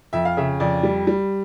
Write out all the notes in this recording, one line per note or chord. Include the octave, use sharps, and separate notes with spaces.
F2 E5
F5
C#3 E5
F2 D5
G3
G3